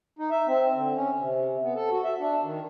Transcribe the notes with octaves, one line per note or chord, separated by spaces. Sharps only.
D#4
E5
C4
D3
C#4
C3
B3
A4
F#4
E5
D4
D#3